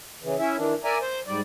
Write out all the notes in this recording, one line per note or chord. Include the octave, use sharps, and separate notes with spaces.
C#3 E3
C#4 E4 E5
D#3 E3 D4
A#4 D5 E5 G#5 A#5
C5
G#2 G3 D5